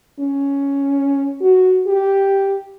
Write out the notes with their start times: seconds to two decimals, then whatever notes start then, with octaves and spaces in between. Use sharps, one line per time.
0.20 C#4
1.41 F#4
1.87 G4